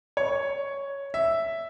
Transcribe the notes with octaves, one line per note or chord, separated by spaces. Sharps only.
C#5
E5